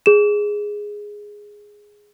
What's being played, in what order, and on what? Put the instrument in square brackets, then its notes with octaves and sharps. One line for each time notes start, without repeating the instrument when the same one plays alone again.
[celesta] G#4 E7